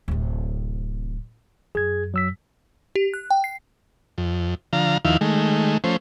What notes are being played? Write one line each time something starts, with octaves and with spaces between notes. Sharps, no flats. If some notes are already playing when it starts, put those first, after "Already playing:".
D1 C3
F#2 G#4 G#6
F#3 E6 B6
G4
F#6
G5
C7
F2
D3 F3 F5 A#5
D#2 D#3 F3 E4 F5
D#3 G#3 A3
F3 A3 C#4 C5